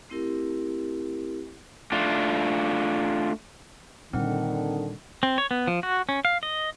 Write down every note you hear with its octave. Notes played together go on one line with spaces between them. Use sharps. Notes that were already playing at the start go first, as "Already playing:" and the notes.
A3 C4 E4 G4 A#4
A3 D4 F4
A#2 D3 D#3 G3 C4 F#5
C4
C#5
B3
F3
F#4
C#4
F5
D#5